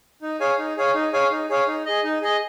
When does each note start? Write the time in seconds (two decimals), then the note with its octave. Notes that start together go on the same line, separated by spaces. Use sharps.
0.22 D#4
0.40 G#4 C#5 F5 G#5
0.59 D#4
0.77 G#4 C#5 F5 G#5
0.94 D#4
1.13 G#4 C#5 F5 G#5
1.31 D#4
1.49 G#4 C#5 F5 G#5
1.68 D#4
1.86 G#4 D#5
2.04 D#4
2.22 G#4 D#5